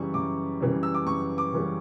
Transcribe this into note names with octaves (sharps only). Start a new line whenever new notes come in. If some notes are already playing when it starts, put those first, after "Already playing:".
Already playing: F#2 C#3 E3 G3 C#6
F#2 D6
C#3 E3 G3
E6
D6
F#2 C#6
D6
C#3 E3 G3